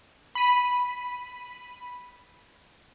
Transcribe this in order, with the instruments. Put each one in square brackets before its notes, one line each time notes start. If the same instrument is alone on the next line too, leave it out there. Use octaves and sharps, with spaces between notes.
[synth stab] B5 D#7